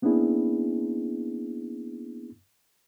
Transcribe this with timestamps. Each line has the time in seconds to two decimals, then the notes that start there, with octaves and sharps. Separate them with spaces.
0.02 A#3 B3 C#4 D4 E4 G#4